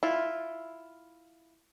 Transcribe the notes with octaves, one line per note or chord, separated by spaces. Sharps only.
E4 F4